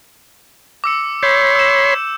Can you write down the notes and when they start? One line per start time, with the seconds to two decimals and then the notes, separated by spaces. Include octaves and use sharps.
0.84 D6 E6 C#7
1.23 C#5 B5 C6 G6
1.55 E6 E7